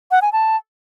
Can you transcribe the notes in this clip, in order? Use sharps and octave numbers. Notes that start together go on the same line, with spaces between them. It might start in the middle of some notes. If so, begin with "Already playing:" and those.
F#5
G#5
A5